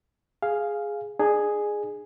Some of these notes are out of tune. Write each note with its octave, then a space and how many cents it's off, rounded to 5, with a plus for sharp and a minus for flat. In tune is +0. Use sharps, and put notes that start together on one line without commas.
G#4 +0 F5 +0
D4 +45 G#4 +0